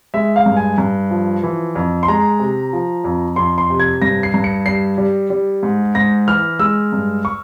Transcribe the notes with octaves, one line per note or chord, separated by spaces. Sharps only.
G#3 E5
F5
G2
G#5
G2
F3
E3
F2
C6
G#3 A#5
C3
F3
F2
F2 C6
C6
C3
G#6
G2 A#6
C7
G2
C#7
G3 C7
G3
G3
G#2
G#2 A#6
E3 F6
G#3 E6
G2
C#6